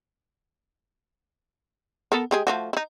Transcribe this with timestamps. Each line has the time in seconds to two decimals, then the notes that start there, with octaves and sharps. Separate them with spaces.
2.12 B3 A4 A#4
2.31 G#3 G4 G#4
2.47 F3 A3 F#4
2.73 D#4 E4